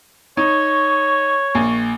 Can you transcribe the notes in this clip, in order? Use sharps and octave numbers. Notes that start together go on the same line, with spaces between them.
D#4 C#5 C#6
A#1 A#3 G#5